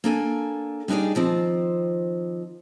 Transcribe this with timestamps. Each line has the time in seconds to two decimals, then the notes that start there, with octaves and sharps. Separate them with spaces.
0.04 A#3 D4 A4 G#5
0.88 G3 D4 D#4 G#4 D5
1.15 D#3 F3 C4